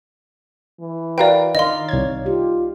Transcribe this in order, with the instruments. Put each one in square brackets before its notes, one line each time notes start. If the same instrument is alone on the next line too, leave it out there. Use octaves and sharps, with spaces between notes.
[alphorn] E3
[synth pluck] F#4 A#4 B4 [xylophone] D5 F5 G5
[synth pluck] D#3 [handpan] D#4 D5 F5 [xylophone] D#5 C6
[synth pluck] C2 G#6 [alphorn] C#5
[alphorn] F4 [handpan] G4